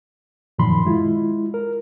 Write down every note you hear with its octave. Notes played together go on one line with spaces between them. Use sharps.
F#2 A#2 D#3 F3 B5 C6
G#3 E4 F4
A#4